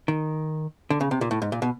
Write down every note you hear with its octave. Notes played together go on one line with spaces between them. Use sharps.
D#3
D3
C#3
C3
A#2
A2
G#2
A#2
B2